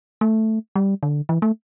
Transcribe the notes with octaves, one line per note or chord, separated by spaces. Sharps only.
A3
G3
D3
E3
A3